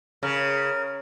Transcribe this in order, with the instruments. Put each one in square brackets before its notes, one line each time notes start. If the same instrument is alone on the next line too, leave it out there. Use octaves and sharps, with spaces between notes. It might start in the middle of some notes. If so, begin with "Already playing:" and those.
[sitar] C#3 [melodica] A#4